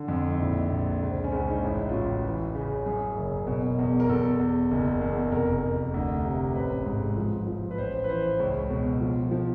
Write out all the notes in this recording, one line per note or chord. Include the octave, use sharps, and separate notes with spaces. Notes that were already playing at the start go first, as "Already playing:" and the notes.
Already playing: D3
F2
D#4
A#1 E4
A#1
C#2
C4
C#4
C#2 D4
D#4
A1 E4
F4
A1 F#4
E3
C#3
F#2 G#4
F#1
B2
E2
A#4
E2 A4
E2
F#1
E2
F1 A#4
F1
D2
C3
A1 B4
G#2
F3
F3
B4
A1 C5
B4
E3 C5
C#2 C#5
B2
F3
F3